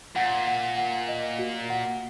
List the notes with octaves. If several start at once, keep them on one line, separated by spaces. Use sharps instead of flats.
A#2 F#5
F#5
F#5
D#5
F#4
F#5